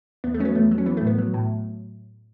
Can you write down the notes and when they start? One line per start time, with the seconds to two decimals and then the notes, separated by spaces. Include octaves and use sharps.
0.24 E2 B3
0.34 A3
0.39 F#3 C#4
0.45 B3
0.55 E2 A3
0.71 F#3
0.78 C#4
0.86 E3 B3
0.97 A3
1.02 A2
1.07 B3
1.18 F#3
1.34 A2